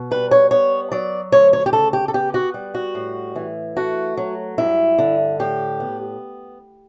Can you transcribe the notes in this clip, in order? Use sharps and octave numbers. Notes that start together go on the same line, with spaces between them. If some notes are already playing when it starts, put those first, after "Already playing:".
Already playing: B2
G3 B4
C#5
B3 C#5
F#3 D5
D2 C#5
C#5
G4
C#3 A4
G4
A4
B3 G4
F#4
G3
F#4
A2
E3
A3 F#4
F#3
G2 E4
D3
A2 G4
B3